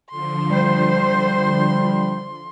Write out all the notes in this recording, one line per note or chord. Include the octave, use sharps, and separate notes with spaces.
D3 F3 C6
G3 C5